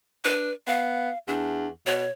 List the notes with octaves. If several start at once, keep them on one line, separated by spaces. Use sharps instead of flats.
D4 B4
B3 F5
E2 D4
B2 C#5